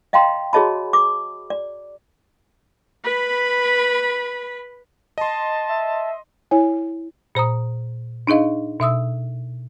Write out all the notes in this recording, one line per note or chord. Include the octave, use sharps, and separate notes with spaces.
D#5 F5 G5 A#5 C6
F#4 G#4 C#5 D#5 A5 B5
D6
D5
B4 B5
D#5 A5 C6
E5
E4 C#5 G#5
A#2 C5 A#5 D#6
D4 D#4 G#4 D#5 F5
B2 E5 D#6 E6